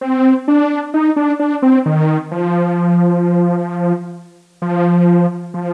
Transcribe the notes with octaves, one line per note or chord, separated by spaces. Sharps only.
C4
D4
D#4
D4
D4
C4
D#3
F3
F3
F3